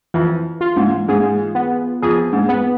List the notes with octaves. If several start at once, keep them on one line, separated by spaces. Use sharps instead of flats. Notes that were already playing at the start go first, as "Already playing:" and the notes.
F2 E3
F4
G#2
G#2 G#4
B3
F2 G#4
G#2
B3